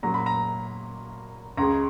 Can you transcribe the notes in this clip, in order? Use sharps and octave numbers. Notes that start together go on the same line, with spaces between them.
A#2 F#3 C#4 A#5
B5
A#5
C#2 C#3 G#3 A#5